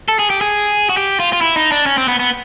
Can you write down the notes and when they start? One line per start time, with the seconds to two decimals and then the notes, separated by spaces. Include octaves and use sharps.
0.08 A4
0.19 G#4
0.30 G4
0.41 G#4
0.90 F#4
0.97 G4
1.20 F4
1.33 F4
1.41 E4
1.56 D#4
1.72 D4
1.86 C#4
1.98 C4
2.08 B3
2.20 B3